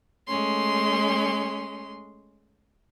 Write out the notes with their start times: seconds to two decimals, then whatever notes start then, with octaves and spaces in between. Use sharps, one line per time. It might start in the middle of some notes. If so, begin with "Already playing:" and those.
0.27 G#3 A3 C#4 C6